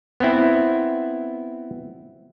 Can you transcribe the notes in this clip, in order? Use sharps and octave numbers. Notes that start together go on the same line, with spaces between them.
B3 C4 E4